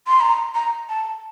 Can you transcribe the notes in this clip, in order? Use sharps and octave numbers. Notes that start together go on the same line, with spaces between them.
C6
A#5
A#5
A5